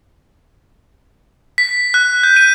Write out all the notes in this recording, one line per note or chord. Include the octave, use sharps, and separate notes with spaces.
B6
F#6
G6
D#7